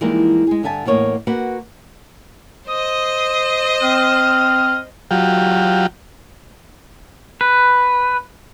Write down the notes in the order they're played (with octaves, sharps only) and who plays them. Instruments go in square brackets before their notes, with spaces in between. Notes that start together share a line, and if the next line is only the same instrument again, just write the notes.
[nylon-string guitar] E3 F3 G3 G#3 A#3 D#4
G#3 G#4
G2 D3 E5 G#5 A5
E2 A2 A#3 C#5 D#5
A#3 F#4 B4 F#5
[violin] C5 D#5 [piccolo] D#6
[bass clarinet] C4 [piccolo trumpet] F6
[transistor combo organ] F#3 F4 G4
[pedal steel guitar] B4